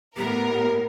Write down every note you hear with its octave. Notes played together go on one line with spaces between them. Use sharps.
A2 B3 G4 A#4